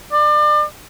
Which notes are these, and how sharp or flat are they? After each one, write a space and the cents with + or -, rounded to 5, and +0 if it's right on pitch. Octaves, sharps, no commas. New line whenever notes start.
D5 +35